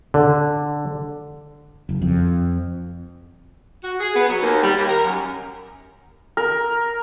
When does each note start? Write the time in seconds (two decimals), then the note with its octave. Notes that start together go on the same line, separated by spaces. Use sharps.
0.14 D3
1.89 F#1
2.01 F2
3.83 F#4
4.00 G#4
4.16 B3
4.29 F#3
4.42 D#2
4.64 G3
4.77 D#2
4.88 A#4
5.05 F#2
6.37 A#4